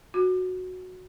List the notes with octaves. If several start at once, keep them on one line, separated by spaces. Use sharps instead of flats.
F#4